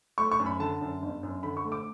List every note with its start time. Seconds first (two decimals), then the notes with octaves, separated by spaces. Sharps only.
0.18 A3 C#6
0.31 C#6
0.40 F#2
0.46 B5
0.59 D3 A5
0.81 F#2
1.02 G1
1.23 F#2
1.43 D3 B5
1.57 C#6
1.64 A3
1.72 D6